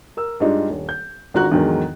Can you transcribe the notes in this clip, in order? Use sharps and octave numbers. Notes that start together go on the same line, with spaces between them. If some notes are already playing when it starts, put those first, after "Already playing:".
A#4 E6
G2 G3 G#3 D4 D#4 F4
D#1
G6
G#1 D3 F4 F#4 A#5 F#6
E2 G#2 D3 D#3 F#3